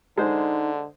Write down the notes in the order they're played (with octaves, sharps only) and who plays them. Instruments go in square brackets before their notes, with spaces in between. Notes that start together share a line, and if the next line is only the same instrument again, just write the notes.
[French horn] D3 [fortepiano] G#3 C5 [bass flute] D#4